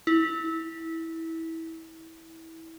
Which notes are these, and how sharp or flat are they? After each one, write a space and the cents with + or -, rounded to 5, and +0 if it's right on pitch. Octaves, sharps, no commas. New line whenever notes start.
E4 -20